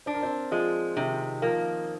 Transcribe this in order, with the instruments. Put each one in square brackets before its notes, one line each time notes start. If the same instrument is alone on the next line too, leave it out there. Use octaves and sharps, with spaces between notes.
[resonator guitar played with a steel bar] D4 [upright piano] C5
[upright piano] A#4
C4 C5
[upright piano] F3 F4 [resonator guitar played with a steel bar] G#3
[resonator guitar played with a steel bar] C3 [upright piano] D#3 D#4
[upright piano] F3 [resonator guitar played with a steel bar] A#3